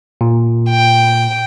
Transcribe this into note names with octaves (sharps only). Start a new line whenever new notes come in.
A#2
G5